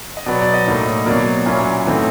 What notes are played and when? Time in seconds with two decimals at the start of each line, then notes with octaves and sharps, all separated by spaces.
0.17 D#5
0.26 B2 F#3 B3 D5
0.41 D5
0.54 D#5
0.66 A2 F#3 A#3 D#4
1.06 B2 F#3 A#3 D5
1.46 A#2 F#3 A#3 C#4 E4
1.85 A2 E3 A3 C4 D#4